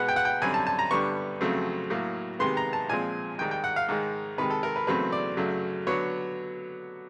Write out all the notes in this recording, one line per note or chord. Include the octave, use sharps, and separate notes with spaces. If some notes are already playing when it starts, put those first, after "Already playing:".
Already playing: B2 G#3 B3 F#5
G5
F#5
G5
F#2 D3 G3 C4 G#5
A5
A5
A#5
G2 D3 G3 B3 C#6
F2 C#3 F#3 A3 C4
A2 F#3 A#3
C3 D#3 G#3 B3 C6
A#5
A5
A#2 F3 G#3 C4 G#5
G#2 D#3 G3 G5
G5
F#5
F5
G#2 D#3 G#3
C3 D#3 G#3 B4
A4
A#4
B4
E2 C#3 F#3 A3 C4 B4
D5
F#2 C#3 F#3 A3
D3 F#3 B3 C#5